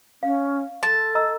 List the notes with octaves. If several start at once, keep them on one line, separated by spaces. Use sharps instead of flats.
C#4 F5
A4 A5 C6
D#5 A#5 E6